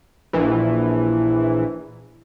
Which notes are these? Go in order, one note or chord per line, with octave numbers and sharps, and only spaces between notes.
A#1 E3